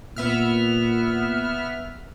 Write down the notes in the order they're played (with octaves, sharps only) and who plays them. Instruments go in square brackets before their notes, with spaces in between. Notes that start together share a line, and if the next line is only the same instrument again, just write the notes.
[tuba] A#2 [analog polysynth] B3 E5 F6